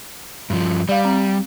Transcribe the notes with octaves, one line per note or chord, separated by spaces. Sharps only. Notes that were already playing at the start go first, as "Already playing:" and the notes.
G2 F3
G3 D5 F5
C4